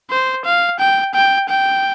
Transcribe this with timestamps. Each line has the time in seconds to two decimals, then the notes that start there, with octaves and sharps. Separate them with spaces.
0.11 C5
0.45 F5
0.79 G5
1.15 G5
1.49 G5